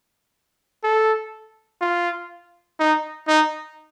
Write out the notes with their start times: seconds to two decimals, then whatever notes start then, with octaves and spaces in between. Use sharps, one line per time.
0.84 A4
1.81 F4
2.80 D#4
3.28 D#4